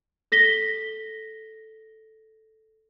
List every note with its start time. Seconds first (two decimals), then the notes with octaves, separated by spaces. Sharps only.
0.32 A4 A#6 B6 G7